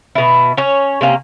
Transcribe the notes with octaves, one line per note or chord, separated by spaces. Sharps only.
B2 E4
C#4 C#5
C3 A#3 C#4